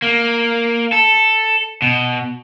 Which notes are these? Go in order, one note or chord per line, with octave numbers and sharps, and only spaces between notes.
A#3
A4
B2